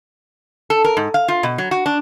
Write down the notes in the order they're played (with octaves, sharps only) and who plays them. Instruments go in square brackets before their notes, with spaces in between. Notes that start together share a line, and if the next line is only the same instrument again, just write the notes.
[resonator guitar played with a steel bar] A4
A#4
G#2
F5
F4
B2
F#3
F#4
D4